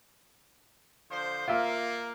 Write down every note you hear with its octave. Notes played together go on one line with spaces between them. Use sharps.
D3 F3 C5
A#3 F4 E5